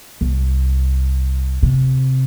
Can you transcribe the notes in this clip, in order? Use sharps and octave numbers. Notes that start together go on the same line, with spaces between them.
C2
C3